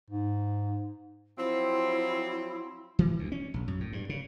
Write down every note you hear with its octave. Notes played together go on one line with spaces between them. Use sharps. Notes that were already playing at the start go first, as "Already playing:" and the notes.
G#2
F3 F#3 C4 E4
E3
D2
C#4
A#1
F#2
A2
G2
C#3